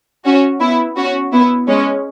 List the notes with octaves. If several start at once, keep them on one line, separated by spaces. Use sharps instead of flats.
C#4 F#4
B3 E4
C#4 F#4
B3 E4
G#3 C#4